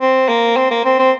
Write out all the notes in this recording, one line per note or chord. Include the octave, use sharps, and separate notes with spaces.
C4
A#3
C4
A#3
C4
C4